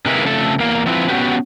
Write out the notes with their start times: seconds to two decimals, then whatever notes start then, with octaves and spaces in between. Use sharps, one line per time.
0.06 C3 D#3 G#3 A#3 E4 B4
0.23 F2 C#3 A3 A4 E5
0.60 E2 A#3 F5
0.86 F3 C4 E4 B4
1.08 B3 C#4 F#4 G4 B4